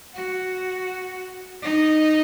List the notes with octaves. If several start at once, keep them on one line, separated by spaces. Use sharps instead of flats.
F#4
D#4